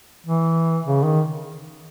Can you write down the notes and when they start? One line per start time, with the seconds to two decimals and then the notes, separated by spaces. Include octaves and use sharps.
0.26 E3
0.85 C#3
1.04 D#3